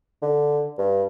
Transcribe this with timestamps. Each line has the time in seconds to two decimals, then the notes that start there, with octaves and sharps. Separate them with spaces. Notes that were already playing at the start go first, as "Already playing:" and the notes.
0.22 D3
0.78 G2